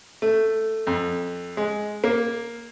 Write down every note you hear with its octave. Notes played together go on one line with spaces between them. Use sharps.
A3
F2
G#3
A#3